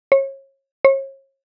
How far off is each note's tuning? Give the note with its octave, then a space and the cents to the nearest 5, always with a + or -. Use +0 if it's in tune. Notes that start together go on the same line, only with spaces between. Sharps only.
C#5 -30
C#5 -40